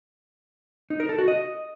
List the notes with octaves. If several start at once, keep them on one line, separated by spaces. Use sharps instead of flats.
D#4
A#4
A4
F#4
D#5